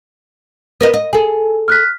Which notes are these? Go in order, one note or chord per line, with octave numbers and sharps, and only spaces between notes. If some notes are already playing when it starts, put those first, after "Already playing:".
B3 A#4 D#5
D#5
G#4 A4 G#5
F6 F#6 B6